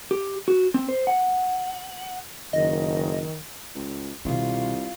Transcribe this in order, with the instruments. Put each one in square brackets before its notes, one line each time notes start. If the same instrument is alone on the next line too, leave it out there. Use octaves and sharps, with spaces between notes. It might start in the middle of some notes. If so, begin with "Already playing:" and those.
[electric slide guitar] G4
F#4
C4
C5
F#5
[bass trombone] F#1 [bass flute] D#3 [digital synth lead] D#5
[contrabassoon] C#2
[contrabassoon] C2 [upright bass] B2 D#3 [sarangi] F4